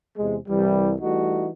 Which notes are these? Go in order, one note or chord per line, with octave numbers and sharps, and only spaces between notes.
E2 C3 G#3
C2 E3 G3
E3 G3 A3 D#4 F#4